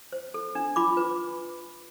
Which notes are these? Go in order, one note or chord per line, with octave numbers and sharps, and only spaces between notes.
C5
A4
D4
F4 B5 D6
B4